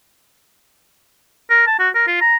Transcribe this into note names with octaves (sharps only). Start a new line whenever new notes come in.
A#4
A5
F#4
A#4
F4
A#5